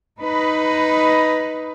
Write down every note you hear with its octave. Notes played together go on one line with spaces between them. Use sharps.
D#4 B4